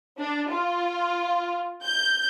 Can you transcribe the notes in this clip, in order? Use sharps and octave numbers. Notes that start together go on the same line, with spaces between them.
D4
F4
G6